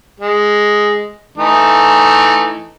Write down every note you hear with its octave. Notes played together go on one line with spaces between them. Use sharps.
G#3
E3 A3 D#4